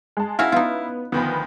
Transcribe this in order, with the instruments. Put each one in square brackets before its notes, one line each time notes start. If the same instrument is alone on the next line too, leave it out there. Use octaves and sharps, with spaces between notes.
[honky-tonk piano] G#3 A5
[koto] C#4 F#4 C#5 [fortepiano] E4 F5
[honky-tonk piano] B3 [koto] D#4 F4
[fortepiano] D2 D#3 F3 [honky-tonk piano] B3 B5